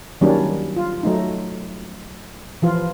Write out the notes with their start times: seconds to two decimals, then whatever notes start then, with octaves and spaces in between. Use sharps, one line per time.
0.21 D#3 F#3 G3 A#3 C#4 D4
0.76 F4
1.03 F#3 A3 D#4
2.62 E3 F3 F4